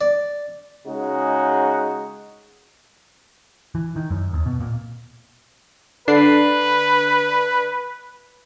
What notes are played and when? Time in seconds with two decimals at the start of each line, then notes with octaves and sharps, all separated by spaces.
0.01 D5
0.86 C#3 G#3 D#4 F#4
3.75 E3
3.96 D#3
4.11 F#2
4.33 D#2
4.46 B2
4.60 A#2
6.08 D3 D4 B4 C7